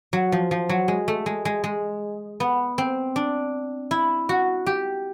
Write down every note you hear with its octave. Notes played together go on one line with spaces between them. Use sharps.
F#3
F3
F3
F#3
G#3
A3
G#3
G#3
G#3
B3
C4
D4
E4
F#4
G4